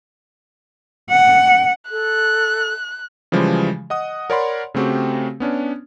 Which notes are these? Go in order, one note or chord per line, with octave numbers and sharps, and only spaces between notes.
F#5
A4 F#6
C#3 E3 F3 G3 G#3
D#5 F#5 D#6
A#4 C#5 D5 F#5 B5 C6
C#3 A3 C4 F#4 G4
B3 C#4 D4